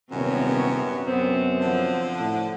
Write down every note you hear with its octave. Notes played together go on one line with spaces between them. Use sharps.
D#1 F#2 C3 B3 C#5
F#2 B3 C4
D3 F3
A2